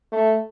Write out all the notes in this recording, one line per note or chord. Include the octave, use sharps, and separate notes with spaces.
A3